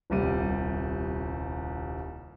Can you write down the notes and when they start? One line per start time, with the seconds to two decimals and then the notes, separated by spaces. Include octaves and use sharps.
0.10 D#1 C2 G3 D#7